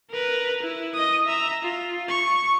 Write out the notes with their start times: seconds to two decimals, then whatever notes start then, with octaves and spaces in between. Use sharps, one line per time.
0.10 A#4 B4
0.62 E4
0.94 D#5 D#6
1.26 E5 A#5
1.63 F4
2.09 C#6